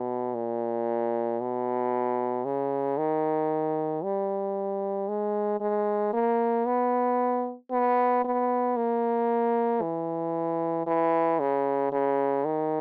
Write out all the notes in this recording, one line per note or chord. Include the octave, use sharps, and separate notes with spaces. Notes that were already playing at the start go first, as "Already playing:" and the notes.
Already playing: B2
A#2
B2
C#3
D#3
G3
G#3
G#3
A#3
B3
B3
B3
A#3
E3
E3
C#3
C#3
D#3